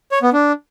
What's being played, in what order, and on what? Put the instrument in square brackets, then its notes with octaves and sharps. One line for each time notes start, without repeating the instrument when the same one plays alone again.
[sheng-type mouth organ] C#5
B3
D4